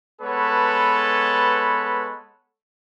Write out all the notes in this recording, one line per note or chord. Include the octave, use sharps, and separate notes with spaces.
G#3 B3 A4 B4 C#5